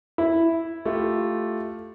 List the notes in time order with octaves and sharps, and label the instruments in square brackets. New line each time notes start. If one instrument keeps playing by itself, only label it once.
[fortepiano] E4
[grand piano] A3 F4 G4